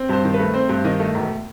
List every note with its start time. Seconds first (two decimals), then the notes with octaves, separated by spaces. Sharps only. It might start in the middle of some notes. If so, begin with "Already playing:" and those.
Already playing: C4
0.09 G2 C5
0.24 D#3
0.34 B4
0.39 A3
0.54 C4 C5
0.69 G2
0.84 D#3 D#5
1.00 A3
1.15 E1